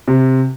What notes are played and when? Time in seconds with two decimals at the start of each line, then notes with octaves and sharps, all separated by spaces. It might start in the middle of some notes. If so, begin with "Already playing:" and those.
0.08 C3